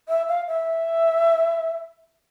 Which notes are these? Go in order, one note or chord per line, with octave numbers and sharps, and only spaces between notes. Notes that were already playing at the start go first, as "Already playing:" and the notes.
E5
F5
E5